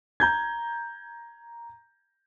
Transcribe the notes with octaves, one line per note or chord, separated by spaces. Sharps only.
A#5 G6 G#6